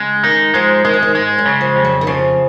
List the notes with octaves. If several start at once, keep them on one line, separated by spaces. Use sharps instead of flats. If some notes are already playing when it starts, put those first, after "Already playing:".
Already playing: C#3 G#3
D#3 D#4
F3 G#3
D#3 G#3
F3
D#3
G#2 G#3
F#2
C#3
F3
F2
F#3
D#3
C#3 F3